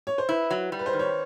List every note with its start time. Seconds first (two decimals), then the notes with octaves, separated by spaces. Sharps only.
0.07 C#5
0.18 C5
0.29 E4 B4
0.51 F#3
0.72 G3
0.79 B4
0.86 C5
0.93 D#3
0.99 C#5